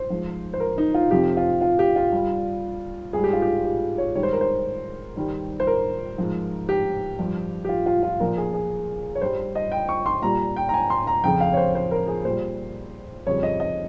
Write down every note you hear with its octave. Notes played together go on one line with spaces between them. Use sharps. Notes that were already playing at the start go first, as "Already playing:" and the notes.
Already playing: C5
G#2 F3
C5
A#4
D#4
F4
F2 C3 F3 G4
F4
F4
G4
F4
G2 G3
G#2 G3 G#4
G4
F4
G4
G4
C#5
G#2 D#3 G3 C#5
C5
A#4
C5
G2 D#3 G3
C5
A#4
G#2 F3
G4
G2 F3
G4
F4
F4
F4
A#2 F3 A#4
G#4
G#4
C#5
G2 G3 C5
D#5
G5
C#6
C6
A#2 G3 A#5
G5
A#5
G#5
C6
A#5
F2 C#3 F3 G5
F5
C#5
C5
C5
A#4
G#4
A#2 G3 C5
F2 C#3 G3 C#5
D#5
D#5